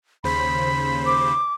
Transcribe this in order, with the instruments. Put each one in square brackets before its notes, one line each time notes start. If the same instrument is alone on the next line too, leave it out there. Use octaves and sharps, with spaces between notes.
[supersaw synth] D#2 C#3 C5 [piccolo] B5
[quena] D6